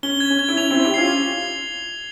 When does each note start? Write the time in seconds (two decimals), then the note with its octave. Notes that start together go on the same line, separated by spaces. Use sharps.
0.03 C#4 G7
0.20 G#6
0.30 C#4
0.39 G#6
0.49 E4
0.57 C#4 F7
0.71 C4 E4 G#6
0.84 E4 G4
0.94 C#4 F4 C7